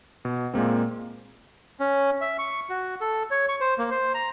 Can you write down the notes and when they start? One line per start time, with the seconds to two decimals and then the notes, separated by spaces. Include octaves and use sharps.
0.25 B2
0.54 A#2 G#3 A#3 C4
1.80 C#4
2.21 E5
2.39 C#6
2.70 F#4
3.01 A4
3.31 C#5
3.49 C#6
3.61 C5
3.78 A#3
3.91 C5
4.14 A#5